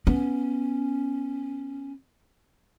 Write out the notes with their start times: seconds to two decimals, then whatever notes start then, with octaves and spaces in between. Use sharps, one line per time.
0.07 B3 C#4